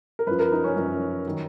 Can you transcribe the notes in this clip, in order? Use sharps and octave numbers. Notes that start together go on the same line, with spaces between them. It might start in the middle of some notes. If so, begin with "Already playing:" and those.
A#4
F#2 F3 B4
A#4
D#4
C#4
F#2 F3
D#3 F#3